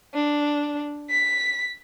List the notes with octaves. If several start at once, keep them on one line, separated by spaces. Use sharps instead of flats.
D4
B6